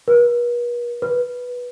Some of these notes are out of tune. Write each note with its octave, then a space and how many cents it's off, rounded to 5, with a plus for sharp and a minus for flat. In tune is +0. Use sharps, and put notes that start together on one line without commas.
B4 -45
B4 -5